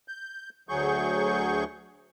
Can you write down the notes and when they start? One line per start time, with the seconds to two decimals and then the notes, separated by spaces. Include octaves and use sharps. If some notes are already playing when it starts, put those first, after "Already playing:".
0.08 G6
0.69 D2 F#3 G#4 C#6 G6